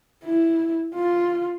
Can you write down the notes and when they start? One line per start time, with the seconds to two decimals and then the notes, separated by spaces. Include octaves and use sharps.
0.24 E4
0.95 F4